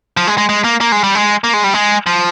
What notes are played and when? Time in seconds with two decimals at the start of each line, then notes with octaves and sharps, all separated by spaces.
0.17 F3
0.27 G#3
0.38 G#3
0.49 G#3
0.64 A#3
0.81 A#3
0.92 G#3
1.04 G3
1.15 G#3
1.44 A#3
1.54 G#3
1.64 G3
1.74 G#3
2.06 F3